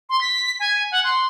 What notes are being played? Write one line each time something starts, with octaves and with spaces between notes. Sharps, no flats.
C6
B6
G#5
F#5
C6